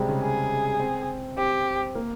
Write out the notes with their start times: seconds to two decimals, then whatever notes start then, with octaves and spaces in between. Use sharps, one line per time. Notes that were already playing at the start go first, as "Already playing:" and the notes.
Already playing: C3 G3 G#3 C4
0.09 C#3
0.23 G#4
0.80 C4
1.37 C4 G4
1.95 A#3